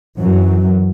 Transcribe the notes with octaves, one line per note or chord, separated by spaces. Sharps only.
F#2 E3 F#3